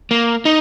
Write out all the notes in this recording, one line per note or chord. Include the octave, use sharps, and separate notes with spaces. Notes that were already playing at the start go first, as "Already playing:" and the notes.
A#3
D#4